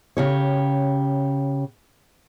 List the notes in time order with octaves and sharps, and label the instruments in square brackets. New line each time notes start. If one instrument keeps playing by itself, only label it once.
[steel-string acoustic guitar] C#3 G4 C#5